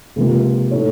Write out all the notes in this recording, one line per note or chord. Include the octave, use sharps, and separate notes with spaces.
C#2 C3 F3 A#3 F4
A2 A3 D#4 A4 C#5